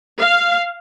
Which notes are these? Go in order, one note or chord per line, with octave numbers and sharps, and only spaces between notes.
F5